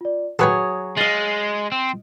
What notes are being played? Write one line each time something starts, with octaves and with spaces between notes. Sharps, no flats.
F4 D5
F#3 G#4 A4 B4 C#5 G5 D#6
G#3 D#5 F5 A6 C7 D#7
C4